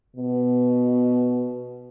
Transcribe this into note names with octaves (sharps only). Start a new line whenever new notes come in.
B2